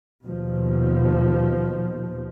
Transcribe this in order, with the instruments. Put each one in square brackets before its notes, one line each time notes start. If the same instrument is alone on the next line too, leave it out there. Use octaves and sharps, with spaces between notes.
[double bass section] D#2 B2 F3